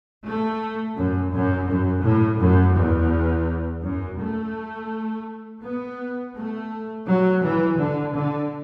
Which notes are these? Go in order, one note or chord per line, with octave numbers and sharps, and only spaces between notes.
A3
F#2
F#2
F#2
A2
F#2
E2
F#2
A3
B3
A3
F#3
E3
D3
D3